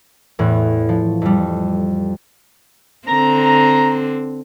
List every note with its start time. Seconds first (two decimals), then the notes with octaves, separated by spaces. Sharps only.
0.39 E2 A2 F#6
0.89 F3
1.22 F2 G3
3.08 D3 C4 A#5